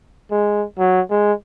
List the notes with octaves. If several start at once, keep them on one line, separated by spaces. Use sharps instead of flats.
G#3
F#3
G#3